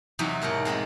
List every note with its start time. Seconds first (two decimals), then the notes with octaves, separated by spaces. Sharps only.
0.19 E2 C3 E3 F#3 D#4
0.41 G#2 B2 A#4 C#5
0.65 C3 G3 G#3 C4